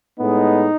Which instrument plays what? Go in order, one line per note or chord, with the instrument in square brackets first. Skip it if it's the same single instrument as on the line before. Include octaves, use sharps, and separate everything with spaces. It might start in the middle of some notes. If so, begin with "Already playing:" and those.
[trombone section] A2 G#3 B3 D#4